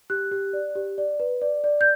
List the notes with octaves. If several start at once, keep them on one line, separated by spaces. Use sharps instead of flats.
G4 F#6
G4
D5
G4
D5
B4
D5
D5
G6